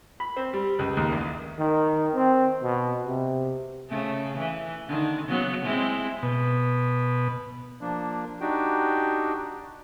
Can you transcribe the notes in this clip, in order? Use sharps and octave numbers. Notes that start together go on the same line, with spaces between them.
B5
C4
G3
C#2
D#2
A1
D#3
C4
B2
C3
C#3 A3
E3
D3 D#3
C#3 F#3 B3
G#3 C4 E4
B2
F3 A#3 D4
D4 D#4 F#4 G4 G5